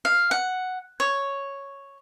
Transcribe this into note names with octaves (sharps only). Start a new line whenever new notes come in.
F5
F#5
C#5